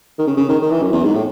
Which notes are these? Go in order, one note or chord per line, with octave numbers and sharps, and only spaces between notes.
D#3
C#3
C#3
D#3
D#3
E3
F#2
E2
G#2
A2